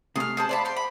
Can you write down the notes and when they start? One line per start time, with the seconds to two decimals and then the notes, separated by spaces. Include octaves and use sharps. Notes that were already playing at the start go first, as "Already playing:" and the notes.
0.16 C3 A3 G#4 F6
0.37 G#4 C5 A5
0.49 C5 D5 F5 A5 B5
0.65 G5 C6
0.76 B5